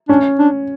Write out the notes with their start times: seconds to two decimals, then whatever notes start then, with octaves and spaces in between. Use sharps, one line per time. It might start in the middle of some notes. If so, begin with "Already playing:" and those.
0.09 C#4 D4
0.39 D4